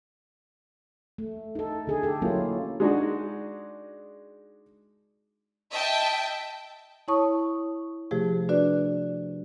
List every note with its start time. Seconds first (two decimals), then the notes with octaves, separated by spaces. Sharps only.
1.18 A3
1.55 D#4 A4
1.87 D3 G#4 A4
2.03 G4 A4
2.22 F#3 A#3 C#4 E4 F4
2.80 G#3 D4 D#4 F#4
5.71 D#5 E5 G5 A5
7.08 E4 C#5 A5 C#6 D#6
8.11 C3 F3 A3 G4 G#4
8.49 D4 F#4 B4 D5